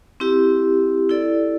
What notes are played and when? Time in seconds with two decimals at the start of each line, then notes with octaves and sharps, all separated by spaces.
0.20 C4 E4 G4
1.09 E4 A4 D5